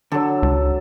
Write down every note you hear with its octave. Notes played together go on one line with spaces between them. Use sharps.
D3 F#3 A4
C#2